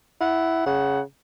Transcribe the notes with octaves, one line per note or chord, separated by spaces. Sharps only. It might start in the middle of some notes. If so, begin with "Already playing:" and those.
E4 F#5
C#3 F#5